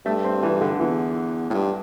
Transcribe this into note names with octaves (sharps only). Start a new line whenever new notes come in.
G2 A3
C4
E3
D3
E2 E3
A2
G2